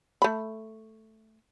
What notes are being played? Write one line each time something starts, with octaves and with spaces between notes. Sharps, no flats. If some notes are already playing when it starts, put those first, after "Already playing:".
A3 B5